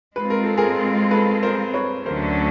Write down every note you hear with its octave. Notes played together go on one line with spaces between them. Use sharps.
G#3 C4 F4 B4
A#4
A4
G#4 A#4
A4 B4
A#4 C5
B4 C#5
D2 D3 F#3 A3 C#4 A#4 C5